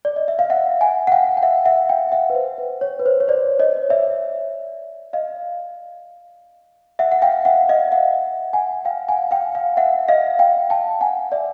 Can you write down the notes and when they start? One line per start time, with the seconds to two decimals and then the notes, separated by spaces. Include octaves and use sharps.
0.05 D5
0.16 D#5
0.28 E5
0.39 F5
0.50 E5 F#5
0.81 F#5 G#5
1.07 F#5
1.12 F5 G5
1.37 G5
1.43 E5 F#5
1.65 E5 F#5
1.89 F5 G5
2.12 E5 F#5
2.30 B4
2.35 C5
2.58 B4
2.81 C#5
2.99 B4
3.06 C5
3.20 C#5
3.28 C5 D5
3.59 C#5 D#5
3.90 D5 E5
5.13 D#5 F5
6.99 E5 F#5
7.12 F#5
7.22 F5 G5
7.45 E5 F#5
7.69 D#5 F5
7.92 E5 F#5
8.53 F#5 G#5
8.85 F5 G5
9.09 F#5 G#5
9.31 F5 G5
9.55 F5 G5
9.77 E5 F#5
10.08 D#5 F5
10.39 F5 G5
10.70 G5 A5
11.01 F#5 G#5
11.32 D5 E5